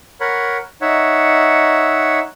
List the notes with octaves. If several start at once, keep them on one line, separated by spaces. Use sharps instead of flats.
A#4 C#5 F#5 B5
D#4 C#5 E5 F#5